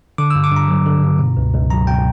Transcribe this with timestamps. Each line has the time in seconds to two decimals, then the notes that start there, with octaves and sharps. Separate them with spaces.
0.18 D3 D6
0.30 G2 E6
0.44 D6
0.51 G2
0.56 A#5
0.68 F#3
0.86 D3
1.03 G2
1.19 B2
1.37 C#2
1.54 C#2
1.70 F#3 A#5
1.87 B2 G5